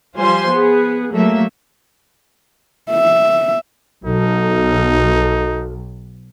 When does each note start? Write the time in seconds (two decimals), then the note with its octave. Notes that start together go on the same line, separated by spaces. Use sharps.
0.17 F3 G3 F4 C5 G#5 C6
0.50 B3 G#4
1.12 F#3 A3 A#3 E5
2.91 E5
4.05 B1 D#4 F#4 A4